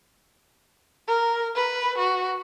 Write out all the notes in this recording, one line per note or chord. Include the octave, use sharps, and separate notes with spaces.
A#4
B4
F#4